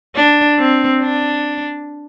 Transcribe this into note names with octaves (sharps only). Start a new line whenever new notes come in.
D4
C4
D4